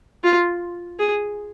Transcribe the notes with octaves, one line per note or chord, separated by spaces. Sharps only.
F4
G#4